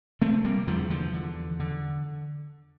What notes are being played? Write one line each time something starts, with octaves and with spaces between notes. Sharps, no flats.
C3 A3 C4
G3 A#3
E2 D3 F3
D3 F3
D3
D3